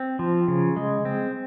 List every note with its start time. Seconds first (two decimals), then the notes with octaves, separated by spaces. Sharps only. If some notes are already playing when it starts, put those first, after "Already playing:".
Already playing: C4
0.19 F3
0.48 C#3
0.76 G#3
1.05 C4